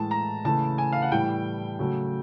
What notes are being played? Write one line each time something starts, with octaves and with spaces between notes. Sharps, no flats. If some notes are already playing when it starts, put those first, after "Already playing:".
Already playing: A2 E3 G#3 A5
A#5
C#3 E3 A3 A5
G#5
F5
F#5
A2 E3 G3 G5
C#3 F#3 A3